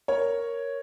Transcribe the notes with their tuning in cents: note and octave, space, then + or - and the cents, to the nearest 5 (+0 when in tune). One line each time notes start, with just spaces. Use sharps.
A#4 +0 C#5 +0